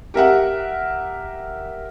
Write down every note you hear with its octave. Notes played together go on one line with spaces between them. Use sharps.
G4 A#4 E5 F#5